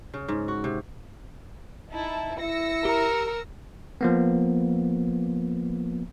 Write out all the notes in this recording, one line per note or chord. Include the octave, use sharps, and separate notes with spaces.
C#3
G#2
F#4
C3
D#4 E4 A5
E4 E6 A#6 C#7
G4 A#4 A#5
F3 A#3 B3